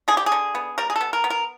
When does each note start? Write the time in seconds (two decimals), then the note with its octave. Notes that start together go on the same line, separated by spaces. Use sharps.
0.08 D3 G#4
0.17 G4
0.26 G#4
0.32 D3
0.55 B3
0.78 G3 A#4
0.90 G#4
0.96 B3 A4
1.13 A#4
1.24 B3
1.30 A#4